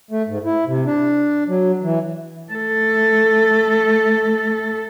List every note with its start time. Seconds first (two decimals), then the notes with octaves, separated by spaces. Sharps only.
0.11 A3
0.28 G#2
0.45 E4
0.67 C3
0.86 D4
1.48 F#3
1.83 E3
2.52 A3 A4